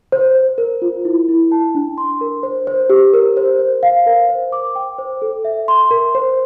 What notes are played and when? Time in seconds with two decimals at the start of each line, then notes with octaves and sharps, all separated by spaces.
0.12 C5
0.35 C5
0.58 A#4
0.82 F4
1.05 E4
1.29 E4
1.52 A5
1.75 D4
1.98 C6
2.21 A#4
2.43 C5
2.67 C5
2.90 G4
3.14 A#4
3.37 C5
3.59 C5
3.83 F5
4.06 A#4
4.29 C5
4.52 D6
4.75 G5
4.98 C5
5.22 A4
5.45 E5
5.68 C6
5.91 A#4
6.15 C5